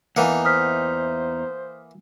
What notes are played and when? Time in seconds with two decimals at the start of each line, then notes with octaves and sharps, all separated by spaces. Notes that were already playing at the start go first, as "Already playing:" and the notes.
0.16 E2 E3 A#3 D#4 F#5
0.45 C5 D#6 F6 B6